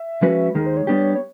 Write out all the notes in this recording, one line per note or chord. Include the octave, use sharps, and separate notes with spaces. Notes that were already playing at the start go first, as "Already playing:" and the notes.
Already playing: E5
F3 G#3 C#4 F#4 B4
D#2 D#3 G#3 A#4
C5
C#5
G3 B3 D4 G4
C#5